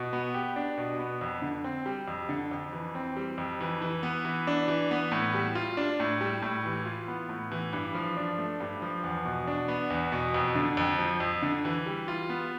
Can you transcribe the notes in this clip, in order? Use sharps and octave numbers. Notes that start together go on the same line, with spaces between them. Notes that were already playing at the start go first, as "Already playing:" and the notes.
Already playing: B2
B3
G4
D4
B2
B3
F2
D3
C4
G3
F2
D3
F2
E3
C4
G3
F2
E3
E3
B3
E3
D4
E3
B3
A2
G3
F4
D4
A2
G3
A2
E3
F4
B3
A2
E3
G2
F3
D4
A3
G2
F3
E2
B2
D4
B3
E2
B2
F2
D3
F2
F3
F2
D3
E3
G3
F4
B3